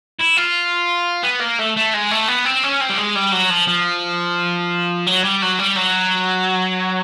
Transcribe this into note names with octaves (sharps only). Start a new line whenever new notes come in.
E4
F4
B3
A#3
A3
A3
G#3
A3
B3
C4
C#4
C4
G3
G#3
G3
F#3
F3
F3
F#3
G3
F#3
G3
F#3